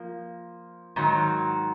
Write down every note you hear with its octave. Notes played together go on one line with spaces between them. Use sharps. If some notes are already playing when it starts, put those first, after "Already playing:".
Already playing: F3 A#3
G#2 D#3 F#3